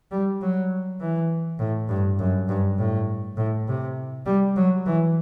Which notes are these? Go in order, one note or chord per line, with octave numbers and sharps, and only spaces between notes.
G3
F#3
E3
A2
G2
F#2
G2
A2
A2
C3
G3
F#3
E3